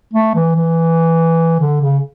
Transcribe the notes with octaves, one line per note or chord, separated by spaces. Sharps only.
A3
E3
E3
D3
C#3